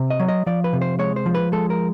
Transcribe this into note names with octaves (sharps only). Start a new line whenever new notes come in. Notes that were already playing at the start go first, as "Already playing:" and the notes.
Already playing: C3
D#5
F#3
D#5
F3 D5
B4
C3
C5
G#3 C#5
C5
F3
B4
G#3 A4
A#4